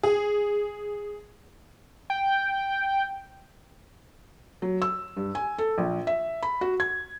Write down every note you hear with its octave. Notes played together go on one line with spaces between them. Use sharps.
G#4
G5
F#3
E6
G2
G#5
A4
A#1
E5
B5
F#4
G#6